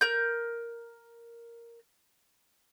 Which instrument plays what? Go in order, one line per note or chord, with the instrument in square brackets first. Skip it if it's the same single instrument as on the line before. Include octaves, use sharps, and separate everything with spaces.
[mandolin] A#4 G6